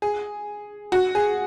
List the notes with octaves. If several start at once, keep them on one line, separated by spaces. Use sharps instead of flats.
G#4
F#4
G#4